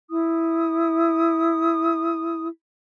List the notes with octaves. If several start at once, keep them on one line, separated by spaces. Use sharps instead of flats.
E4 D#6